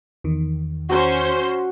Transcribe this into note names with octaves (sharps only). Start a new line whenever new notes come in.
E2 D#3
C#4 F#4 C5 A#5 C6